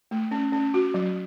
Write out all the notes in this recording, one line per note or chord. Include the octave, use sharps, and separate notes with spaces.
A3
C#4
C#4
F#4
F#3